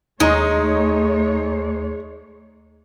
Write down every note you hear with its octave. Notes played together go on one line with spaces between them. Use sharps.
D#2 G#3 A3 D#4 C#5 A#5 C6